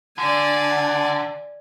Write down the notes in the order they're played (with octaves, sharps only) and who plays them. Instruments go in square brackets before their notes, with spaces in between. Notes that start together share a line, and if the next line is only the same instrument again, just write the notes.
[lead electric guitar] D3 [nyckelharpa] D5 G#5